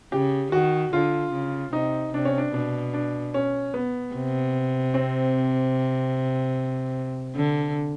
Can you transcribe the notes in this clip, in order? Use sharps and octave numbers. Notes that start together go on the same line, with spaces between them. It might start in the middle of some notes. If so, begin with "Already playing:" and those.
C#3 G4
D#3 F#4
D3 F4
C#3
C3 D#4
C3 D4
C#4
D4
B2 D4
D4
C#4
B3
C3
C4
D3